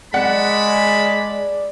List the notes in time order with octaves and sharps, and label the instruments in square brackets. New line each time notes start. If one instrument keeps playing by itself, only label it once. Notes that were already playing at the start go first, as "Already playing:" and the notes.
[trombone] G#3 [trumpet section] A#4 A5 B5 [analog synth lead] D5 [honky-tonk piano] F#5